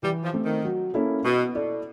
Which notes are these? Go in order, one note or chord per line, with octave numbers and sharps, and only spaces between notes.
E3 G3
F3
A3 C4
D#3
F#3
A#3 C#4 E4 A4
B2 B3
E4 A4 D5